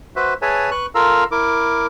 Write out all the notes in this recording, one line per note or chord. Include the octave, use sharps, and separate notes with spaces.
F#4 B4 C5 E5
G#4 B4 C#5 E5 G#5 A5
B4 C#6 F#6
F4 A4 A#4 F5 A#5 E6
E4 A#4 D6